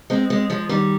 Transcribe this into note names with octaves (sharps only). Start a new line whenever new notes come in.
G#3 C4
G#3 C4
F3 G#3
D#3 G3